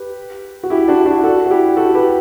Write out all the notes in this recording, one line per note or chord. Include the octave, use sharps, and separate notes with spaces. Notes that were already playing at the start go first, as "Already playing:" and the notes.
Already playing: G4 B4
F#4
E4 G4
D4 F#4
D4 F#4
F#4 A4
F#4
E4 G4
F#4 A4
G4 B4